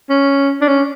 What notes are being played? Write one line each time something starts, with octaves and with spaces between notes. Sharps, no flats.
C#4
D4
C#4